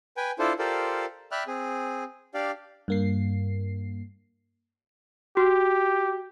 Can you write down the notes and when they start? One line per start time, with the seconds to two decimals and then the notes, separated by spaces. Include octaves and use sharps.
0.17 B4 G5 G#5
0.39 D4 E4 F4 A4 C5
0.59 F4 G4 A4 A#4 C5 D5
1.32 D5 E5 G5 B5 F6 F#6
1.47 C4 G#4
2.34 D4 G4 D5 F5
2.88 G2 A#3 C7
5.37 F#4 G4